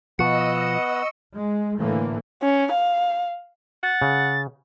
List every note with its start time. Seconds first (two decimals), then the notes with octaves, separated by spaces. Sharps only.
0.19 B2 F3 B3 D#5 F#5 C#6 E6 C#7
1.34 G#3
1.79 A2 D3 E3 A3 A#3
2.42 C#4
2.72 F5
3.83 F#5 A6
4.02 C#3